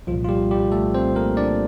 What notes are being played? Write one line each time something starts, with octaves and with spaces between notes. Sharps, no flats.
C2 A#2 F3 F4
F4
G3 G4
G3 G4
A3 A4
C4 C5
A#3 A#4
D4 D5